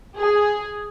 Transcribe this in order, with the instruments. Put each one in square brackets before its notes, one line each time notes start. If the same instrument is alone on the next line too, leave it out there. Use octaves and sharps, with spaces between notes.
[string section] G#4